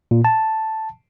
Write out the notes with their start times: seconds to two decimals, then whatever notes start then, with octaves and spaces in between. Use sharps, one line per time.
0.11 A#2
0.25 A5